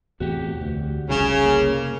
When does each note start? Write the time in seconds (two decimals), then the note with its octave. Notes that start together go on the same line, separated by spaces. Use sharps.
0.20 E2 A2 C3 F#4 G4
0.61 D2
1.09 F1 C2 C#3
1.45 A#3